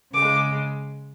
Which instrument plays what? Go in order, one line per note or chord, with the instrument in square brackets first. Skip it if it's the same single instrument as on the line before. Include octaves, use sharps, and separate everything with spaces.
[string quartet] C#3 G#3 D6